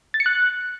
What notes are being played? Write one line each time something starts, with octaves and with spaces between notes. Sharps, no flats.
A6
C#7
F#6